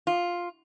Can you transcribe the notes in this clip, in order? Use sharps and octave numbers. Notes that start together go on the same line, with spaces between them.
F4